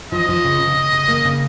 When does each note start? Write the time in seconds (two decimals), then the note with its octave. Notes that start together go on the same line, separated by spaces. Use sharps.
0.12 F3 D#5
0.29 F3
0.45 C#3
0.61 C#3
0.77 C#3
0.93 C#3
1.08 A#3
1.25 C#3